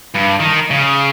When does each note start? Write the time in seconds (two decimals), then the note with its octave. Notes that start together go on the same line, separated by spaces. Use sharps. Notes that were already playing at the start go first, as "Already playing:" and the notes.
0.15 G2
0.40 D#3
0.71 C#3